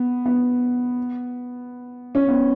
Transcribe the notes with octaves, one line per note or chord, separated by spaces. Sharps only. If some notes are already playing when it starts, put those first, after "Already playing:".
Already playing: B3
B3
C#4
B3